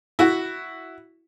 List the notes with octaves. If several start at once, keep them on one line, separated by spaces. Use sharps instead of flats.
E4 F#4